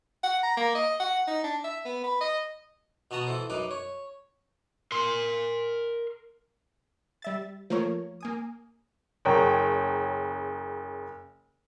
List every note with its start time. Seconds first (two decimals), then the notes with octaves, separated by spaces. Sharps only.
0.24 F#5
0.43 A#5
0.57 A#3
0.75 D#5
1.00 F#5
1.28 D#4
1.44 D4
1.65 E5
1.85 B3
2.04 B4
2.21 D#5
3.11 B2 B3 F#4 A5 A#5 D#6
3.27 E3 A4 C5
3.50 F#2 D#4 B4 D6
3.71 C#5
4.92 A#4 C6
7.22 G3 E5 A6
7.70 F3 A3 A#3 A#4 C#5
8.21 A#3 G#5 D#6
9.25 F#1 C#3 A#4 C#5 G5 A#5